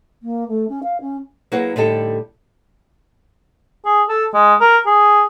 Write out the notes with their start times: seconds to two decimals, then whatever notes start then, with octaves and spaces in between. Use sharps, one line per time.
0.22 A#3
0.48 A3
0.69 C#4
0.83 F5
1.01 C#4
1.52 F#3 A#3 E4 G#4 B4 F#5
1.76 A2 D3 G3 D#4 G4 A4
3.85 G#4
4.08 A4
4.34 G#3
4.61 A#4
4.86 G#4